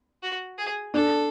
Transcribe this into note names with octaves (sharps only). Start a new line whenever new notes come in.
F#4
G#4
D4 A4